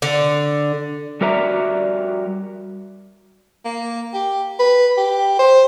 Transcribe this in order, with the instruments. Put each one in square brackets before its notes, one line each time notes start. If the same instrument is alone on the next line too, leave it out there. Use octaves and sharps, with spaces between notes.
[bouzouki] D3
[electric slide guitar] G3 F#4 A#4 D5 E5 A#5
[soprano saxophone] A#3
G4
B4
G4
C5